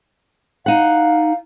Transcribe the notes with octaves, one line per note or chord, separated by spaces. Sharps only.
D#4 F5 F#5